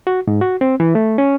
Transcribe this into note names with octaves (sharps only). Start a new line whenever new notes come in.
F#4
G#2
F#4
C4
E3
A3
C#4